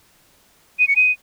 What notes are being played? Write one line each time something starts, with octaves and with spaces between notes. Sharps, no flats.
D#7
C#7
D#7